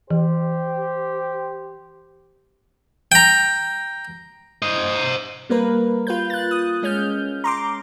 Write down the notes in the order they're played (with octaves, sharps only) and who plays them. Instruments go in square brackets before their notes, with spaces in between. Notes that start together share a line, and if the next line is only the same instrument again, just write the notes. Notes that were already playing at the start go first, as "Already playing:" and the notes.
[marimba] E3 [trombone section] G4 C5
[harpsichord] G5 A#5
[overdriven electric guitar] C5 D#5
[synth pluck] G3 A#3 A#4 B4
F4 B4 G6
F#6 A6
D#6
G#3 C#4 F6 G6
A#5 C6 D6